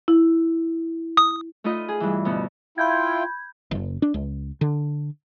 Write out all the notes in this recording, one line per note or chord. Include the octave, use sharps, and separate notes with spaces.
E4
D#6
A3 D#4 F4 B4 D#5
G#4
G2 E3
D2 B2 B3
E4 F4 G5 B5 G6 G#6
F#1
D4
C#2
D3